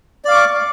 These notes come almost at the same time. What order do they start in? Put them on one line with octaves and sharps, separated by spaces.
D5 F5 D6 C#6